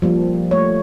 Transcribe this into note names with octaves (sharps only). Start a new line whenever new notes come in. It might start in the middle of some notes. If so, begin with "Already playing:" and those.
F3 G3 A#3
A3 C#5